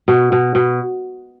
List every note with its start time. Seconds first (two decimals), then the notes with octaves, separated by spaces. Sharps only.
0.08 B2
0.32 B2
0.55 B2